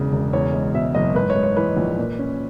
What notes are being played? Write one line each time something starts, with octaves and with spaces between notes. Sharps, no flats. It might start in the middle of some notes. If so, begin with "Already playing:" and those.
Already playing: E1 E2 C#3
E1
E2 C#5
G#3
B2 E5
F#1 D#5
G#2 B4
C#5
G#3
C#5
E3 B4
A#1
A#2
C#4